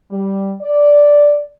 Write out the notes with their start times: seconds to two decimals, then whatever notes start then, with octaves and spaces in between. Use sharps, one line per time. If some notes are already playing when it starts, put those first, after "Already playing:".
0.11 G3
0.61 D5